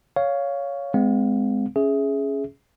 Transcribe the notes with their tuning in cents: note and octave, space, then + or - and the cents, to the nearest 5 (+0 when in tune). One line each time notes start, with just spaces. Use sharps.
C#5 +15 F5 +0
G#3 +0 C4 -40 F5 +20
C#4 +0 G#4 +10 E5 -10